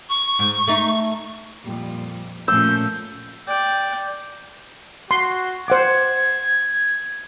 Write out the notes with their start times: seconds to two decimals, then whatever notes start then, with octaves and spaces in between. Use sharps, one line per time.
0.09 C#6
0.39 G#2
0.68 A3 D#4
1.64 F2 A#2 G3
2.48 A#2 F3 A3 C#4 E6 G6
3.47 D5 G5
5.11 F#4 C6
5.68 C5 F#5 D6 G#6